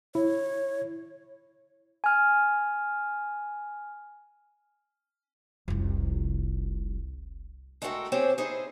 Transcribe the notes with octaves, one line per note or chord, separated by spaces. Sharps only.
E4 C#5
G#5 F6
F1 C2
G#3 A3 F#4 A4 A#4 G5
C4 G4 G#4 C5 C#5
D#4 E4 G#4 C5